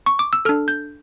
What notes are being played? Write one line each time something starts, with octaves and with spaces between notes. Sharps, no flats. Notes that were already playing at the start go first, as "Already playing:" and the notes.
C#6
D6
E6
D4 A4 F6
G6